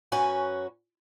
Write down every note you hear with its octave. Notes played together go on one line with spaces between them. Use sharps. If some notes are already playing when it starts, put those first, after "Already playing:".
F#2 C#4 F#4 B4 G#5